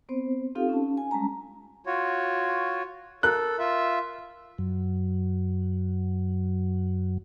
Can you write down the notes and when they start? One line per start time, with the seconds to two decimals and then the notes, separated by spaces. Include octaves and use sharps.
0.09 B3 C4 C5
0.55 C4 D#4 F4 G4 A4 F5
0.69 C#4 A5
0.97 G#5
1.11 G3 G#3 C#4 A5 A#5
1.86 F4 F#4 C#5
3.23 A4 A#4 F#6
3.59 F4 E5
4.58 F#2 F#3